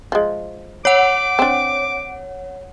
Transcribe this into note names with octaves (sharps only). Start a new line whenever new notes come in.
F3 G#3
C#5 F#5 D6
C4 D4